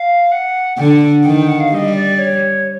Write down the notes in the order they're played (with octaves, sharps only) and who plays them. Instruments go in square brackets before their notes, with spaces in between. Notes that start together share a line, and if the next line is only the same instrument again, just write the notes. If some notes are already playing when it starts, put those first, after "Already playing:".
Already playing: [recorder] F5
F#5
[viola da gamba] D3 [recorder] F#5 G5
[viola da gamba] D#3 [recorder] G5
[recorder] G5
F#5
F5
[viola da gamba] G3 [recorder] D#5 F5
[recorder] D5
C#5